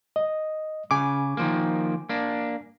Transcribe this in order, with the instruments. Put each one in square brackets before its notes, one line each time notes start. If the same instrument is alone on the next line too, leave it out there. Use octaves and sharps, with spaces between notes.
[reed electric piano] D#5
[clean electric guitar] C#3 [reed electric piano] G#5 D6
[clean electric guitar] D#3 F3 A#3
A#3 D4